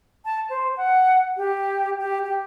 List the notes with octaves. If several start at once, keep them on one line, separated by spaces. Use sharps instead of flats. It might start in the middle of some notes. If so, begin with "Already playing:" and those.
A5
C5
F#5
G4
G4
G4